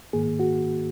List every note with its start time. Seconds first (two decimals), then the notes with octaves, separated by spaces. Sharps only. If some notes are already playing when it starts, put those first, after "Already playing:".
0.13 G#2 D#3 A#3 G#4
0.40 F#4